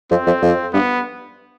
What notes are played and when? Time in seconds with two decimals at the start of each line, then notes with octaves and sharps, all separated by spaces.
0.11 F2 C4
0.27 F2
0.43 F2
0.73 G2 B3